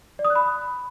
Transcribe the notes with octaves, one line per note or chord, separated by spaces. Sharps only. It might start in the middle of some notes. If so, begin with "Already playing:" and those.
D5
D#6
F#6
B5